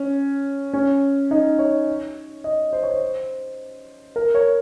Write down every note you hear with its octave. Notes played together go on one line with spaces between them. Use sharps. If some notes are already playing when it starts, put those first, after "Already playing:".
Already playing: C#4
C#4
D#4
C#5
D#5
C5
C#5
C5
A#4
C#5